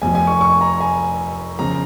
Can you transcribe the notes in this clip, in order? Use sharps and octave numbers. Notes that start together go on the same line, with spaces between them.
F1 F2 F3 G#5
G#5
C#6
C#6
A#5
G#5
C#3 F3 A#5